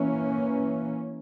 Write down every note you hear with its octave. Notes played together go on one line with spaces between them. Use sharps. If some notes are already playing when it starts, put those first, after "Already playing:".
Already playing: E3 A#3 C#4